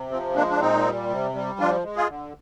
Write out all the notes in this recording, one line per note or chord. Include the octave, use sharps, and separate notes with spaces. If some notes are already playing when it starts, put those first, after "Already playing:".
Already playing: C3
F3 C4
G#3 A#3 D4
D4
A#2 C4 D#4
G3
C3
G3
F3 D4 F4
G#3
F4 G#4
D3